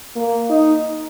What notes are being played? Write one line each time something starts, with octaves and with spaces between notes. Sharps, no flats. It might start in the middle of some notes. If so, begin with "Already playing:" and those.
A#3
D#4